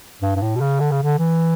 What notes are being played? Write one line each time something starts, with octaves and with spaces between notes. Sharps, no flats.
G2
G2
A2
B2
C#3
D3
C#3
D3
E3